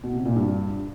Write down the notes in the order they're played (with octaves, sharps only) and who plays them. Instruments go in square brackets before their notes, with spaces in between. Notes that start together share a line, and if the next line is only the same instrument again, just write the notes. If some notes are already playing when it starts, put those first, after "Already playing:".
[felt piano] B2
C3
A#2
G2